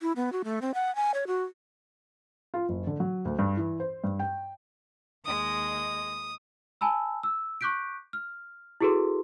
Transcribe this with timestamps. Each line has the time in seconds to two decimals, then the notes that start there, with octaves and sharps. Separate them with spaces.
0.01 E4
0.16 B3
0.32 F#4
0.44 A3
0.61 C4
0.74 F#5
0.95 G#5
1.14 C#5
1.27 F#4
2.54 F4
2.69 F#1
2.87 D3
3.00 F#3
3.25 D2
3.39 G2
3.57 E3
3.80 C5
4.04 G2
4.19 G5
5.25 D#2 G#3 D#5 D#6
6.81 G#5 A5 B5 E6
7.23 E6
7.61 C#6 D6 F#6 G6 B6 D7
8.13 F6
8.81 E4 F#4 G#4 A4 B4 C6